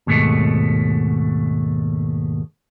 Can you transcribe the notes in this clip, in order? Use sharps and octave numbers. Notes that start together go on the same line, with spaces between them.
D#2 G#2 B2 A3